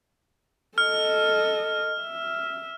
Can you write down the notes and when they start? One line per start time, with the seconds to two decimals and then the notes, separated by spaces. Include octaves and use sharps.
0.78 A4 D#5 F6
2.01 E5